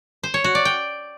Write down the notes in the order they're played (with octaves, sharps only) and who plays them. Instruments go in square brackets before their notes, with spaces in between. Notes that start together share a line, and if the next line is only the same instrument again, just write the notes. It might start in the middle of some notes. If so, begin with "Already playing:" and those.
[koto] C5
C#5
F#4
D5
G5